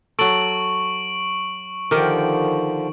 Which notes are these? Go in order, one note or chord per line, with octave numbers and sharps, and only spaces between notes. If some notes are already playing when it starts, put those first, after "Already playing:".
F#3 A4 C#6 D7 F#7
D3 D#3 F3 G4 A#4